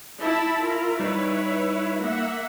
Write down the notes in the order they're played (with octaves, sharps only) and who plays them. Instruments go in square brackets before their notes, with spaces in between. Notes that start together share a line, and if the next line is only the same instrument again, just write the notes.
[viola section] E4 A5 B5
E4 F4 A#4
[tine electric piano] G3 D#4 [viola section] E4 B4 C#5
[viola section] A#3 E5 F#5